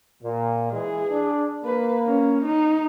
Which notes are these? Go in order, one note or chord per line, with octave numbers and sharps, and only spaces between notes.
A#2
E3 G#3 G#4
D4
A#3 B4
C#4
D#4